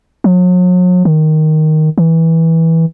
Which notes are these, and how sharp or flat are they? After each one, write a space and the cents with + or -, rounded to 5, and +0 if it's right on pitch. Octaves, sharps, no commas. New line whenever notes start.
F#3 -40
D#3 +0
E3 -15